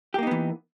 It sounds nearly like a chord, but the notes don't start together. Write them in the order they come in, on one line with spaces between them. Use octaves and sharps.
G4 A#3 D#4 B3 E3